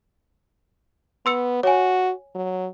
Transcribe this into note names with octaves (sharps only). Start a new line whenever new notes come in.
B3 C6 E6 C#7
F#4 C#5 G#5
F#3